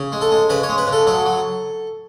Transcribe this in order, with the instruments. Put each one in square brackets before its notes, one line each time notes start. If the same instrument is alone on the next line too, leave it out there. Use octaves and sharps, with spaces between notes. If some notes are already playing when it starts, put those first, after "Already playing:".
Already playing: [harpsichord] C#3
G#3
A4
G#3
C#3 B4
C#5
G#3
B4
C#3
A4
F#3 A4
F#3